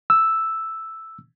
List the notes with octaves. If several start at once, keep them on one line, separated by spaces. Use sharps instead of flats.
E6